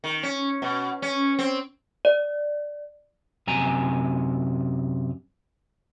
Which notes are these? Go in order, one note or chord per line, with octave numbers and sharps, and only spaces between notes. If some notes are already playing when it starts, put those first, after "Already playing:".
D#3
C#4
B2
C#4
C4
D5
F#2 C3 G#5 A#5